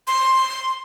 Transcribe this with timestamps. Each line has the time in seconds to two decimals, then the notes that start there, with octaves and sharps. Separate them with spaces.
0.07 C6